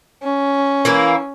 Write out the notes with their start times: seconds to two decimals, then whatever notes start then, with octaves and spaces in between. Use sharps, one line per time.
0.22 C#4
0.85 E3 A#3 E4